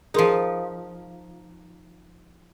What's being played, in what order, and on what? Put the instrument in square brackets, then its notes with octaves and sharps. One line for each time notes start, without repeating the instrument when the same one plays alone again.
[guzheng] F3 D#4 [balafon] G#4 A#4 C6